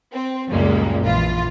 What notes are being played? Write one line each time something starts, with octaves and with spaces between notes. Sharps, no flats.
C4
C#2 F#2 A#2 G3 G#3 A#3
A#1 E3 F4